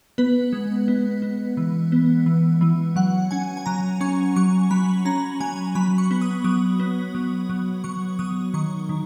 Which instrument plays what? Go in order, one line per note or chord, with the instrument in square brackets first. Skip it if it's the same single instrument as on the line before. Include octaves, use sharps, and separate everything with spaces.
[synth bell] B3 B4
G#3
B3
B3
E3
B3
E3
E3
F#3 F#5
C#4 G#5
G#5
F#3 A#5
C#4 C#6
F#3 C#6
F#3 B5
C#4 A#5
F#3 G#5
F#3 B5
C#6
B3
D#6
F#3 D#6
B3
F#3
F#3
F#3 C#6
F#3 D#6
D#3 C#6
D#3